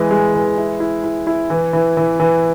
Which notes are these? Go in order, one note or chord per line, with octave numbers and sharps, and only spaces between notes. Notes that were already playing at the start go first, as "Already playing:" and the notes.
Already playing: E3 G#3
G#3
E3
E4
E4
E4
E4
E3
E3
E3
E3